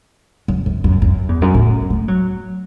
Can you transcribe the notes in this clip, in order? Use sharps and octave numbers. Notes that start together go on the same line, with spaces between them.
F#2
F#2
F#2
F#2
E2
F#2
A2
A3
F#3